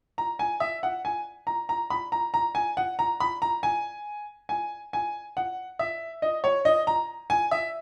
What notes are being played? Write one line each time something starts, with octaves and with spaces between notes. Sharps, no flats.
A#5
G#5
E5
F#5
G#5
A#5
A#5
B5
A#5
A#5
G#5
F#5
A#5
B5
A#5
G#5
G#5
G#5
F#5
E5
D#5
C#5
D#5
A#5
G#5
E5